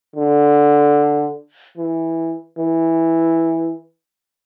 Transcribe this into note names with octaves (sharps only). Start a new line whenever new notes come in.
D3
E3
E3